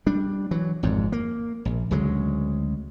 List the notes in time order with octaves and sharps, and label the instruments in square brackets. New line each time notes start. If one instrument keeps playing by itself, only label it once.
[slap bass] G3 D4
E3 F#3
G#1 F2 G#2
A#3
A#1
D2 C#3 F#3 G#3